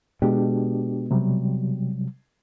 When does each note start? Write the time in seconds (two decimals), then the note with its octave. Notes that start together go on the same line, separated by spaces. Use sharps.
0.22 B2 G#3 D4 G4
1.11 C3 F#3 G3